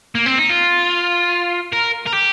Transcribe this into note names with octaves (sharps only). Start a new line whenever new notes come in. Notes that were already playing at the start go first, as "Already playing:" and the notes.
A#3
C4
D#4
F4
A#4
A#4
G4